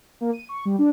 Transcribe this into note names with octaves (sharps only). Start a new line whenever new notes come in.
A#3
D#7
C#6
G3
D4